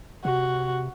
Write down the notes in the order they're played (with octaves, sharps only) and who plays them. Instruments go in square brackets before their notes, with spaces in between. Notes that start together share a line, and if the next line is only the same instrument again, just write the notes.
[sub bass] C3 [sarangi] F#4